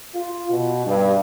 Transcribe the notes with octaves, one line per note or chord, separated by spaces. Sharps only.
F4
B2
G2